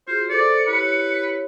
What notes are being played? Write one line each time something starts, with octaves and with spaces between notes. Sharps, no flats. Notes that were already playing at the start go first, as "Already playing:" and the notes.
F4 F#4 G#4 C5
A4 C5 D5 D6 C#7
E4 G4 B4 C#5